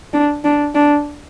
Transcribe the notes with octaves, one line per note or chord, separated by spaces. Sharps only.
D4
D4
D4